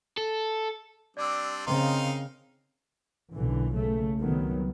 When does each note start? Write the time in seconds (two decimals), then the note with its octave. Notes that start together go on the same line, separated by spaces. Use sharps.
0.17 A4
1.17 G3 C4 D4 D5 D6 E6
1.67 C#3 C4 D#4 A#4 D#5 F5 C6
3.34 B1 A#2 D3 E3
3.78 C#3 A3
4.18 C2 D#3 F#3 B3